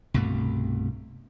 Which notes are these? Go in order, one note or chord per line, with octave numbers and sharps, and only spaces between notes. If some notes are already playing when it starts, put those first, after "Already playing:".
C2 G2 B2 A3